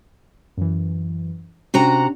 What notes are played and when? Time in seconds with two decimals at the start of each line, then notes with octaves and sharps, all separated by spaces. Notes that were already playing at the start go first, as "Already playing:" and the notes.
0.57 F#2 E3
1.74 C3 C#4 D4 F#4 A#5